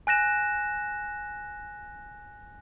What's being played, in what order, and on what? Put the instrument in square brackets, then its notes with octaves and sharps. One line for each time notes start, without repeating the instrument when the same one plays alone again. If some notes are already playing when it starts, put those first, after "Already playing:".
[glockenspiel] G#5 F#6 A#6 E7